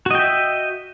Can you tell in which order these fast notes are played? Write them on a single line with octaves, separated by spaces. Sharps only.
F#4 D#5 G5 E5